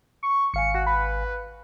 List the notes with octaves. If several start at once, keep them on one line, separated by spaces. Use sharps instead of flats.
C#6
G#1 F5 G#5 C#7
F#4
B4